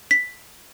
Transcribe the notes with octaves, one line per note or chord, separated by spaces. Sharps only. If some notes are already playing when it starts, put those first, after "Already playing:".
B6